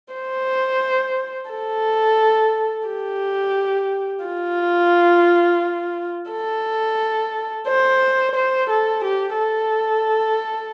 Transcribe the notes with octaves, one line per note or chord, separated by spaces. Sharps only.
C5
A4
G4
F4
A4
C5
C5
A4
G4
A4